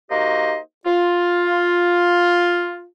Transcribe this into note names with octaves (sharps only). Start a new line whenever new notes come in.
A#3 D#4 F#4 G4 C5 D#5
F4